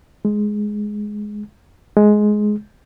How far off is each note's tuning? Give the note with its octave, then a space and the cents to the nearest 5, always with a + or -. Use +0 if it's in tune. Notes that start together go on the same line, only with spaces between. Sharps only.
G#3 +10
G#3 +15